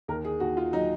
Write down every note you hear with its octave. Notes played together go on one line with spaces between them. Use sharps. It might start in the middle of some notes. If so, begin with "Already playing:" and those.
D#2 A#4
G#4
D#2 F#4
F4
F#3 D#4